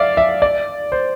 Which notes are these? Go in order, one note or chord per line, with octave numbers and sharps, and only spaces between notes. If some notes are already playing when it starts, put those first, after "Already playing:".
Already playing: D5 E5 F5
E5
D5
C5